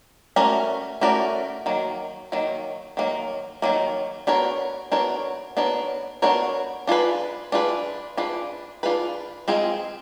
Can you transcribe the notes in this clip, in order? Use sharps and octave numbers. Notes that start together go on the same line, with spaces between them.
A3 C#4 F#4 A#4 D5
A3 C#4 F#4 A#4 D5
D#3 F#3 A#3
D#3 F#3 A#3
D#3 F#3 A#3
D#3 F#3 A#3
B3 D4 F#4 A#4 C#5
B3 D4 F#4 A#4 C#5
B3 D4 F#4 A#4 C#5
B3 D4 F#4 A#4 C#5
D4 F4 G#4 B4
D4 F4 G#4 B4
D4 F4 G#4 B4
D4 F4 G#4 B4
G#3 C4 F4 G#4